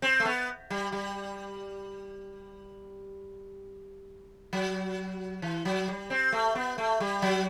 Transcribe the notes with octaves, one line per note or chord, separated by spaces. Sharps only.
C4
A3
B3
G3
G3
F#3
E3
F#3
G3
C4
A3
B3
A3
G3
F#3